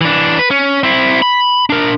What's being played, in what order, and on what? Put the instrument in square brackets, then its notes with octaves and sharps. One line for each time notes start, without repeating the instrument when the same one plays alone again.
[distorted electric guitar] E3 D4
B4
C#4
C4 E4
B5
D4 A#4